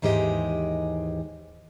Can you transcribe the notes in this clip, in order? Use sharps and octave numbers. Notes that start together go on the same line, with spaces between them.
D#2 G#2 E3 G#3 G4 D#5